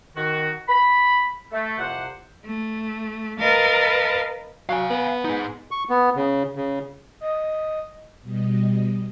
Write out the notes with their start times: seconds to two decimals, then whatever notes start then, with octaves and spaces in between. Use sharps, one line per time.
0.15 D#3 F#4
0.69 B5
1.52 A3
1.78 C2 F2 C3 C5 F#5
2.44 A3
3.39 A#4 B4 D#5 F5 A5 A6
4.69 F#3 F5 G#5
4.90 B3
5.25 D#4 G#4
5.71 C#6
5.90 B3
6.16 C#3
6.56 C#3
7.21 D#5
8.22 B2 G3 D#5